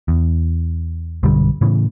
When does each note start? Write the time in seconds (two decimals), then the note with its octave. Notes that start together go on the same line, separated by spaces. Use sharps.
0.08 E2
1.23 B1 G2 D3 G3
1.61 A2 C#3 E3